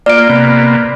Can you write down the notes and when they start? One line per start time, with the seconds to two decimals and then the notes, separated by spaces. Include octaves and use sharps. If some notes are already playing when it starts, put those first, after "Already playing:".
0.06 A#3 F4 D5 D7
0.29 C3 A#3 B3